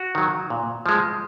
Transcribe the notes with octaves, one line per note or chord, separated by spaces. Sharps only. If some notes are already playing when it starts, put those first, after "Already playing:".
Already playing: F#4
D#3 F#3
A#2
F3 G#3